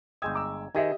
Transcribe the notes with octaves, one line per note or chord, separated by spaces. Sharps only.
G1 G#3 G5 D#6 E6 G#6
A#5 D6 E6
D#3 G4 G#4 C5 D#5 E5